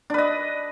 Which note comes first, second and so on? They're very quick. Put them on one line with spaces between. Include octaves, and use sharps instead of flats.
D4 B4 D#5